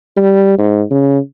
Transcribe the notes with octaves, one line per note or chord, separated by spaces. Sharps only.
G3
G#2
C#3